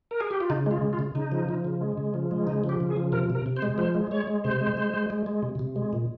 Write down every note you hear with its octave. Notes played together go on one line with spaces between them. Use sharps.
A#4
G#4
G4
F4
C#3 D#4
G#3 F4
C#3
F4
C#3
C#3 D#4
F3
F3
C#3
G#3
C#3
F3
G#3
C#3 D#4
F3
G4
C#3
G#4
F3
C3 A#4
C3
A#4
C3
C5
G#3
F3 C5
G#3
G#3 C#5
G#3
C3 C5
G#3
G#3
G#3
G#3
G#3
C3
C3
G#3
A#2